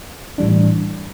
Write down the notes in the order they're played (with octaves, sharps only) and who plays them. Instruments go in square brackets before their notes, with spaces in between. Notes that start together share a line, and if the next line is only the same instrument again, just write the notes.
[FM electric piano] A2 E3 G3 D4